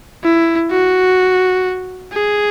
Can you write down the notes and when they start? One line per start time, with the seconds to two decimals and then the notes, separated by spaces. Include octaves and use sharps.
0.24 E4
0.71 F#4
2.12 G#4